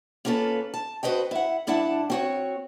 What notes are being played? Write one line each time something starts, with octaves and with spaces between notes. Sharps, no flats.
A#3 C#4 F4 A4 B4
A5
F#4 B4 C5 D#5 G5
E4 F#5
G2 D4 E4 F#5 A5
C4 F#4 C#5